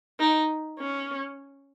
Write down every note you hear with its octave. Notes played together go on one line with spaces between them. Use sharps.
D#4
C#4